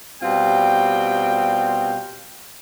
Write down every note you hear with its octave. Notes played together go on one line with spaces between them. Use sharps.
B2 G3 C4 F4 G5